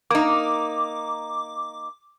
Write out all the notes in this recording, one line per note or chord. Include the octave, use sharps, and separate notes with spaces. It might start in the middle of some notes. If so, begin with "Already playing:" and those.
A#3 D#4 D6